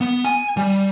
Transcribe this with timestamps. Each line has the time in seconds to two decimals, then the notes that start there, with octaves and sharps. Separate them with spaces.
0.01 B3
0.25 G#5
0.57 G3